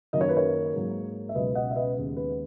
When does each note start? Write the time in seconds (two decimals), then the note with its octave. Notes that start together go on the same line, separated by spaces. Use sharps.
0.13 F#2 D#3 F#3 A#3 D#5
0.21 C#5
0.29 B4
0.37 A#4 C#5
0.74 G#2 F#3 A#3
1.29 E5
1.35 C#2 B2 F#3 B4 D#5
1.55 D#5 F#5
1.71 E5
1.75 B4 D#5
1.96 D#2 C#3 G#3 B3
2.16 B4